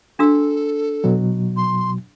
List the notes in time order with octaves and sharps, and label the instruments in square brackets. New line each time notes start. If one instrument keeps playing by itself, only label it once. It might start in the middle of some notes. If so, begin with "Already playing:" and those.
[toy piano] D4 F#4 E6 [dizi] A4
[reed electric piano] B2 F#3
[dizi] C6